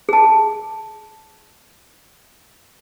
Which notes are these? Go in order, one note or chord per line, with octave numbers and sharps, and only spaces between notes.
G#4 A5